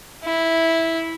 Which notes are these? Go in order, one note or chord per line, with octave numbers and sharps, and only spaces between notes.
E4